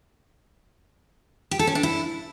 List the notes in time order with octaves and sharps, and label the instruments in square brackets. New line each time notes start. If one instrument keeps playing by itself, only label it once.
[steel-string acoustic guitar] G4
A4
C#4
D4
E4